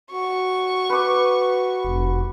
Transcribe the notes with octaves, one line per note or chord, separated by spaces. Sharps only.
F#4 C#6
B4 D6
F1